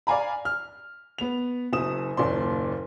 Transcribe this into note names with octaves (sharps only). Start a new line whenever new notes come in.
D5 F5 G#5 A#5 B5
F6
B3 F7
F#1 F#2 D#6 E7
F#1 D#2 A#2 C#4 D5 C6